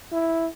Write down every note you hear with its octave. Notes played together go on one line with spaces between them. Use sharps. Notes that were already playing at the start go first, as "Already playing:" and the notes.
E4